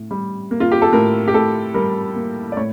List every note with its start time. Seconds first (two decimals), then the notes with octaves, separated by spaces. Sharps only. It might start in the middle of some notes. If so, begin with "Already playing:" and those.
Already playing: A2
0.11 G3
0.51 A#3
0.60 F4
0.72 G4
0.82 A4
0.93 A2 A#4
1.28 G4
1.34 A2 A4
1.74 G3 A#4
2.16 A#3
2.52 D5
2.57 A2 C#5